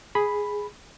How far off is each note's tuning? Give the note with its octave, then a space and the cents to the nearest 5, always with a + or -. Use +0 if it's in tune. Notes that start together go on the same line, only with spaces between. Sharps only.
G#4 +0 B5 +0